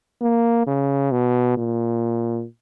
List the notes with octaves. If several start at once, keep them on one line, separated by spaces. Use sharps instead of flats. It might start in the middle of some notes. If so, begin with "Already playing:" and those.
A#3
C#3
B2
A#2